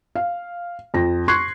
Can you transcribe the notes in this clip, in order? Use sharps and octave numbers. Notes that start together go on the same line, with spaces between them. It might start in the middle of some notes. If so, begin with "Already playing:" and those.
F5
F2 A#6
C6 C#6 F#6 G#6 C7